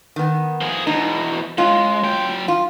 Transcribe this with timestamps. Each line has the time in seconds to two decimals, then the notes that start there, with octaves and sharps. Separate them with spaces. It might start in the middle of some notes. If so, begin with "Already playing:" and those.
0.16 D#3 B3
0.61 F3 G#4
0.87 E2 B2 D#4
1.58 G#3 C#4 F4
2.04 F#3 G5
2.48 F4